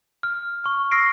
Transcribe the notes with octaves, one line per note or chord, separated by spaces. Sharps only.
F6
C#6 F6
C#6 E6 F6 A#6 C7 D7